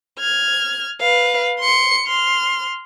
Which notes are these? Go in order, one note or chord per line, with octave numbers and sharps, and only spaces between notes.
F6 G#6
B4 F5
C6 C#7
C6 F6